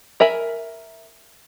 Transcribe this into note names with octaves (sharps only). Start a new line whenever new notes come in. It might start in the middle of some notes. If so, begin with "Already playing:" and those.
A#4 E5 G#5 B5